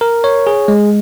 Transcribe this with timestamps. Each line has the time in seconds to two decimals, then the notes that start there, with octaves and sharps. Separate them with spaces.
0.01 A#4
0.24 C#5
0.47 G#4
0.68 G#3